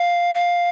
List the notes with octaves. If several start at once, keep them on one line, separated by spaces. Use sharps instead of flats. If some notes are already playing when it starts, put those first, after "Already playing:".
Already playing: F5
F5